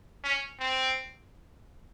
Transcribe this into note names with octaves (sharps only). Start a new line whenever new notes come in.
C#4
C4